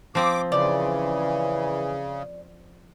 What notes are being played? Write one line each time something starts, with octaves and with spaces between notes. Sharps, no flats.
F3 C4 D6
C#3 E3 D5